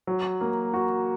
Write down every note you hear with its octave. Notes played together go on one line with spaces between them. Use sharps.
F#3
A#3
F#4